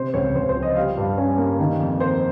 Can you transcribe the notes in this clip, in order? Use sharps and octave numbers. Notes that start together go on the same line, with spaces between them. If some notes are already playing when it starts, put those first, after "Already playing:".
Already playing: C3 C5
C#2 C#5
C#2 C5
C5
F3
D#5
G3 F5
G2
C#4
A#3
D#3
F2
A#3 C5